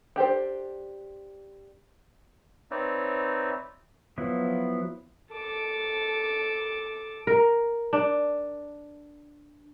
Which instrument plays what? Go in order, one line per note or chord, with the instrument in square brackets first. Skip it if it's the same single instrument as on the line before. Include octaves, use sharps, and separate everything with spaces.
[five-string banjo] D4 G4 A4 C5
[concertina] C4 D#4 B4 C#5 D5 E5
[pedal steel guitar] F3 F#3 B3 E4
[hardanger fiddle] A4 D6
[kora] A#4
D4